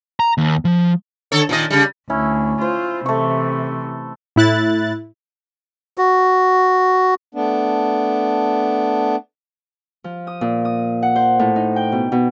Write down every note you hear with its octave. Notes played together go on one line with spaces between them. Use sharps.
A#5
D#2
F3
D3 A4 C#5
A#2 D#3 D#5
C#3 G3
D2 C#4 E4
F4 C5
C3 E3 A3 C#6
A2 E4 F#6 A6
F#4
A3 B3 D4
F3
D#6
A#2
D#6
F#5
C5
A2
D#4
G5
B2
B2